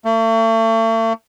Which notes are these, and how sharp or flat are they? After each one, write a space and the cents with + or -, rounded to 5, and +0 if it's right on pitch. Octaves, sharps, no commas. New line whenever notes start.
A3 +40